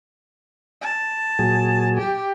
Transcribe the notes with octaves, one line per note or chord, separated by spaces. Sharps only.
A5
A#2 F#3 G#4
G4